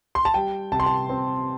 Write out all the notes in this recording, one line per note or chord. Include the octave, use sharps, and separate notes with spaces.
C6
A5
G3 G5
C3 A5
C6
A5
C4